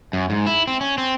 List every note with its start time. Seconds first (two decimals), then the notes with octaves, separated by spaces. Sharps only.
0.13 F#2
0.30 G#2
0.47 E4
0.67 C4
0.81 C#4
0.98 C4